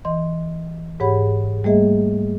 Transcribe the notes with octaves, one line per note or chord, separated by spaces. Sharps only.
E3 D#5 C6
G#2 G4 G#4 C#5 F#5 B5
G3 A3 A#3 G#4 D#5 E5